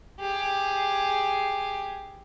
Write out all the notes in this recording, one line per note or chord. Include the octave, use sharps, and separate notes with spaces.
G4 G#4